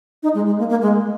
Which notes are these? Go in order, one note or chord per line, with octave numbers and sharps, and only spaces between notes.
D#4
G#3
G#3
A#3
A#3
G#3